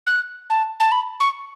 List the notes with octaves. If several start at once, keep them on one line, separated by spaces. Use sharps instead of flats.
F#6
A5
A5
B5
C#6